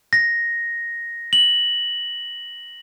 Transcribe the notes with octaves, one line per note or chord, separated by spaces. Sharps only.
A#6
F#7